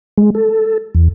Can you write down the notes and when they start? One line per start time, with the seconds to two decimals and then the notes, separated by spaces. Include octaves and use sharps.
0.18 G#3
0.35 A4
0.95 E2